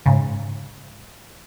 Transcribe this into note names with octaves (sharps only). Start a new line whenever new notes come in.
G#2 C#3